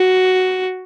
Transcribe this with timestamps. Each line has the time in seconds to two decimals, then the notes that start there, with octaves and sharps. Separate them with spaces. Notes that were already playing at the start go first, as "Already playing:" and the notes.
Already playing: F#4